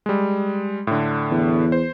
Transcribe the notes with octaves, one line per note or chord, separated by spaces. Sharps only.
G3 G#3
A2 D3
E2
C5